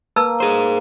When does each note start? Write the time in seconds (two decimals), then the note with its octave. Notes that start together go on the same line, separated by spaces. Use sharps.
0.16 A#3 B4 A5 E6
0.40 G#4 C5